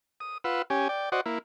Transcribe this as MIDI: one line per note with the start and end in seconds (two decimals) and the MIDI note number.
0.20 0.38 87
0.44 0.62 65
0.44 0.62 71
0.44 0.62 78
0.44 0.62 88
0.70 0.88 61
0.70 0.88 67
0.70 0.88 80
0.89 1.09 74
0.89 1.09 79
1.12 1.21 66
1.12 1.21 72
1.12 1.21 74
1.12 1.21 75
1.12 1.21 78
1.26 1.38 58
1.26 1.38 64